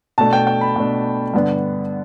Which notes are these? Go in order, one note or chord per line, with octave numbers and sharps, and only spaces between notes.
B2 A3 D4 A5
G5
G5
B5
B2 A3 D4
G2 D3 B3 D4